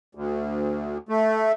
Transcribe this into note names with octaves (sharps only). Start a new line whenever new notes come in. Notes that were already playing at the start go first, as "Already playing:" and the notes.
D2
A3